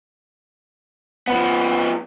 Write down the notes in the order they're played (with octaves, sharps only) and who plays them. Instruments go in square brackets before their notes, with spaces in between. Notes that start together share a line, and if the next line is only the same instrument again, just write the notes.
[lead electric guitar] F3 B3 [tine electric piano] F#5 B5